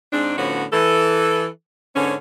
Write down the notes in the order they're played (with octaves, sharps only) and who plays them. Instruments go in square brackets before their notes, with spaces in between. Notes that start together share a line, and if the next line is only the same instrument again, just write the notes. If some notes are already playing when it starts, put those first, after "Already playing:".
[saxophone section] G#2 C4 D4
A2 D3 F3 B3 C#4 F#4
E3 A4
G#2 D3 B3 C#4